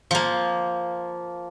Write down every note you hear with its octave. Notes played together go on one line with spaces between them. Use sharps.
F3 A#3